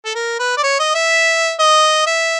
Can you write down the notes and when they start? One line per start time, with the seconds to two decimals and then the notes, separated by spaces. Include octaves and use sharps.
0.05 A4
0.15 A#4
0.39 B4
0.58 D5
0.63 C#5
0.80 D#5
0.95 E5
1.59 D#5
2.07 E5